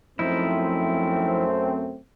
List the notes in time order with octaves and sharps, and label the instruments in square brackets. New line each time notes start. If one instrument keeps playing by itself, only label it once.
[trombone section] F#2 A3 C4 [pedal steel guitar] F3 D#4 E4